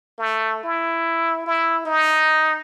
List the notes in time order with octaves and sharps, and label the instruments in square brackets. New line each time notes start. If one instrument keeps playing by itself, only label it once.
[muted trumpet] A3
E4
E4
D#4